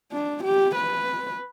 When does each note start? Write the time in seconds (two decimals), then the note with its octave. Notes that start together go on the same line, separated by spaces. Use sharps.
0.12 D4
0.44 G4
0.75 B4